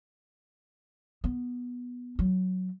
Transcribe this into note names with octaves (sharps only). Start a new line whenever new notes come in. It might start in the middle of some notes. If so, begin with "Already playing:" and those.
B3
F#3